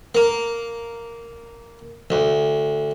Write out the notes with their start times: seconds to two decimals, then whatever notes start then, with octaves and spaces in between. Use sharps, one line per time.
0.15 A#3
2.10 D2